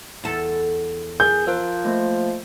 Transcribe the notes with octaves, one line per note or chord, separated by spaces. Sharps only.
E2 A4
G#4 A#4 G6
F3 A#4 C5
A3 A#3